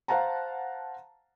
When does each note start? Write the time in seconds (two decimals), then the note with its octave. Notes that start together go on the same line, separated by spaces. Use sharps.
0.08 C5 F5 F#5 A5 A#5